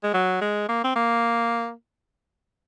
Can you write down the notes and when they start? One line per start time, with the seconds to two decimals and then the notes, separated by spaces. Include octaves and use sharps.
0.03 G#3
0.14 F#3
0.41 G#3
0.69 A#3
0.84 C4
0.96 A#3